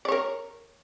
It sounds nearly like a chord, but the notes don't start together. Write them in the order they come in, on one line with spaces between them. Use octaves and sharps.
D5 C#5 A#4